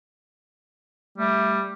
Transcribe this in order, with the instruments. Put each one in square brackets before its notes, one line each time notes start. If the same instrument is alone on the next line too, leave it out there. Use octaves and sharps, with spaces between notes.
[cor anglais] G3 [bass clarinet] A3